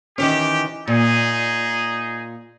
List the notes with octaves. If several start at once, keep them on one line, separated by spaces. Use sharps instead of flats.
D#3 E3 C#4 G4
A#2 D#4 G#4